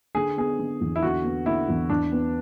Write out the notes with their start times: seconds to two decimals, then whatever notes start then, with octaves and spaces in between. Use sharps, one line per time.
0.15 D3 G#4
0.37 B3 G#4
0.59 D3
0.81 E2
0.96 E4
1.02 D3 F#4
1.24 B3
1.46 D3 E4
1.68 E2
1.89 E2 D4
2.12 B3